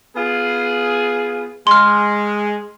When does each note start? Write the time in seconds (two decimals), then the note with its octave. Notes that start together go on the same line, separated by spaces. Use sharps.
0.16 B3 F4 G#4
1.67 G#3 C6 F6